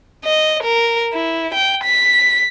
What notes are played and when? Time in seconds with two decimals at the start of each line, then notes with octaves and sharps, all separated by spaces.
0.25 D#5
0.63 A#4
1.13 E4
1.54 G5
1.84 B6